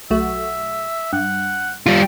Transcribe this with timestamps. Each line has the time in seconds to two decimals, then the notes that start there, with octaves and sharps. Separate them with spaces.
0.10 B1 A3 F#4 E5
1.13 G2 F#5
1.86 G3 F4